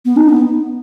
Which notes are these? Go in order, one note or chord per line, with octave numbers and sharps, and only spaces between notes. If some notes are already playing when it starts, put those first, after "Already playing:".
B3
D#4
B3